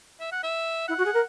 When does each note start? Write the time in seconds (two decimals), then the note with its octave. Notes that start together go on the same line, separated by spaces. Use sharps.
0.20 E5
0.32 F#5
0.43 E5
0.88 E4 F#5
0.97 F#4
1.05 G#4
1.14 A#4